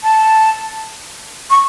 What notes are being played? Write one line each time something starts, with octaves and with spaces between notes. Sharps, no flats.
A5
C#6